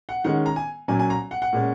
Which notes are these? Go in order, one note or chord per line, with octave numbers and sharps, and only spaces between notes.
F#5
D#3 G#3 C#4 F#5
A#5
G#5
A#2 F#3 C#4 G#5
G#5
A#5
F#5
F#5
A#2 G#3 C#4